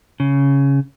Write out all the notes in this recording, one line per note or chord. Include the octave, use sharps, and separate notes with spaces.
C#3